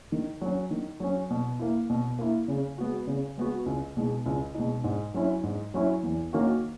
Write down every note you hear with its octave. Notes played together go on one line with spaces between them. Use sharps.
D#3
F#3 C#4
D#3
F#3 C#4
B2
A#3 E4
B2
A#3 E4
C#3
G#3 B3 F#4
C#3
G#3 B3 F#4
C#2
B2 G#3 D#4
C#2
B2 G#3 D#4
G#2
F#3 C#4 E4
G#2
F#3 C#4 E4
E2
D#3 A#3 C#4 F#4